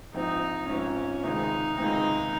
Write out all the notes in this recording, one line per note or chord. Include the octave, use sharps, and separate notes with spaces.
A#1 G#2 F3 C4 D#4
A#1 G#2 F3 C4 C#4
C#2 C3 D#3 G#3 C4 D#4
C#2 C3 D#3 G#3 C4 D#4